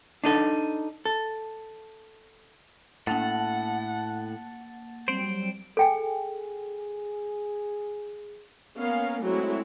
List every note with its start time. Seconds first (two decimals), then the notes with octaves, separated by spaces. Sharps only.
0.24 D4 D#4 A4
1.05 A4
3.07 A2 A#3 F#5 A5 A6
5.08 F#3 G3 C4 C5 D7
5.77 G#4 A4 G5 G#5
8.77 A#3 B3 C#4 A#4 F5
9.21 F#3 G#3 A3 C4 E4 C#5